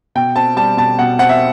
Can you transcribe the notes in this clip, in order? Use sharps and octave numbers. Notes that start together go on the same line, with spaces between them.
B2 G5
C4 A5
G3 A5
B2 A5
B2 F#5
C4 F#5
E5